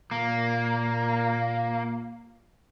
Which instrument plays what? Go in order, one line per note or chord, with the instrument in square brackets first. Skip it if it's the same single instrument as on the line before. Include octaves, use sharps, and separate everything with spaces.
[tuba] A#2 [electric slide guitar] A#3